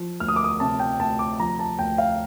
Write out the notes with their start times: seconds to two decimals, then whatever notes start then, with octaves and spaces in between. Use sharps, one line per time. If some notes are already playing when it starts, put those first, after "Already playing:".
Already playing: F3
0.20 D2 F6
0.28 D#6
0.36 D6
0.44 D#6
0.60 C3 A5
0.80 G5
0.99 D2 A5
1.19 D6
1.39 F3 A#5
1.59 A5
1.79 D2 G5
1.98 F5